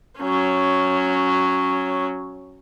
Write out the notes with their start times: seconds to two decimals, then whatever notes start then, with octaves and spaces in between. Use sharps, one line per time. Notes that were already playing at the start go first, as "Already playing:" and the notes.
0.19 F#3 C#4